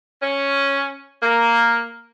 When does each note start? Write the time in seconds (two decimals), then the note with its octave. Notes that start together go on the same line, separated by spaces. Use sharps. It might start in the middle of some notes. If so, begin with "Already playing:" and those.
0.22 C#4
1.23 A#3